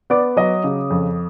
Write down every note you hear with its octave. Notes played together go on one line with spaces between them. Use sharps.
B3 D5 D6
F#3 D#5 D#6
C#3
F2